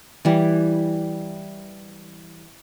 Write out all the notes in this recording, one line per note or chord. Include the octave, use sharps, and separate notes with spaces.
E3 G3